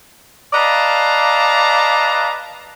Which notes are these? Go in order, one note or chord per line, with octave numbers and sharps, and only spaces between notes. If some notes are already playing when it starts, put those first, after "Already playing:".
B4 D5 D#5 F5 A5 A#5